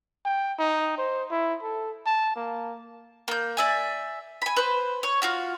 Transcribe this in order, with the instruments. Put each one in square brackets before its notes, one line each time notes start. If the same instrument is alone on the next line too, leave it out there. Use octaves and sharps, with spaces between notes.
[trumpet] G5
D#4
C5
E4
A4
A5
A#3
[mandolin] A#3 G6
D5 E5 G#5
G#5 B5
B4 C5
C#5
F4 F#4 F5